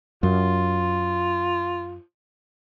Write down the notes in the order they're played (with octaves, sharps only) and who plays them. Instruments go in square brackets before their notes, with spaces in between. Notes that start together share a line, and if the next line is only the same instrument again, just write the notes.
[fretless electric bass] F#2 [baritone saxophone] F4